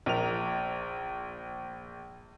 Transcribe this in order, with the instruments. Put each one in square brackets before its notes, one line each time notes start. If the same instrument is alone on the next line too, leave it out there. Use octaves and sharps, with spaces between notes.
[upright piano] A#1 A#4 F7